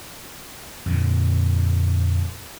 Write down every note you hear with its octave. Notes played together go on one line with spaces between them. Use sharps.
F2 A#2 D3